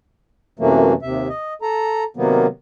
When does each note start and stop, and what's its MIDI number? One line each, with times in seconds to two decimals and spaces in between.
0.59 0.93 42
0.59 0.93 48
0.59 0.93 52
0.59 0.93 54
0.59 0.93 57
0.59 0.93 58
1.02 1.28 39
1.02 1.28 48
1.02 1.28 76
1.29 1.54 75
1.62 2.04 69
1.62 2.04 82
2.17 2.46 48
2.17 2.46 51
2.17 2.46 54
2.17 2.46 58
2.17 2.46 59